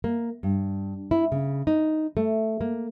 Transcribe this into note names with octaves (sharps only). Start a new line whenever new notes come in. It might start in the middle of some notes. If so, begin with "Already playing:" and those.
A#3
G2
E4
C#3
D#4
A3
A#3